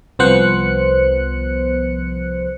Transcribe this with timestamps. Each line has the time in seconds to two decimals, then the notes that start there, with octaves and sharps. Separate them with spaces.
0.19 C2 F3 B3 C5 F#6 C#7